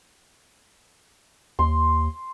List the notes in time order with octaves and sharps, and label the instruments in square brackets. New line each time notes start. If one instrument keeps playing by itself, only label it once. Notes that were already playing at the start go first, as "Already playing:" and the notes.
[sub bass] D#2 [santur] C6